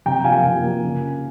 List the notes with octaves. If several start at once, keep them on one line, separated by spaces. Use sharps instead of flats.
C3 G5 A#5
F3 F5 G#5
A#3
C3
F3 A#3
C#3